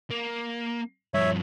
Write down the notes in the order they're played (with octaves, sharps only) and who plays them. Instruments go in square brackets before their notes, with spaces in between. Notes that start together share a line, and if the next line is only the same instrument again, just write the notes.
[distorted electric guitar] A#3
[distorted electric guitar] G2 F3 [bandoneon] C#5 E5